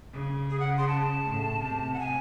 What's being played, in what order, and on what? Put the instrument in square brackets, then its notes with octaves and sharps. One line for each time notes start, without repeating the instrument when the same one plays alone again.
[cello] C#3
[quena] G#4
F#5
C6
A5
[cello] A2
C3
[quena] F#5
G#5